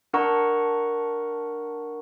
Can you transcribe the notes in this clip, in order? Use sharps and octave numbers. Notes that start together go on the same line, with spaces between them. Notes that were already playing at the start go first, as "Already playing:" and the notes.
D4 A#4 F#5 A#5 C#6